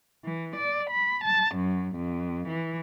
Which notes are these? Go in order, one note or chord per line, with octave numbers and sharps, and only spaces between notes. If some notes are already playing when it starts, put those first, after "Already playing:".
E3
D5
B5
A5
F#2
F2
E3